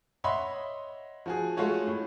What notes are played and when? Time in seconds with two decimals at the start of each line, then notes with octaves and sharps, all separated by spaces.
0.24 C#5 D#5 E5 F#5 B5 C6
1.26 F3 F#4 G#4
1.57 G#3 A3 F4 F#4 C#5
1.87 A2